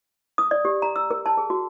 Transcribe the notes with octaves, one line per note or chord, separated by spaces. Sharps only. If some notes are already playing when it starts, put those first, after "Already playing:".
D#6
D5
G4
A#5
E6
A#4
A5
G#4
F#4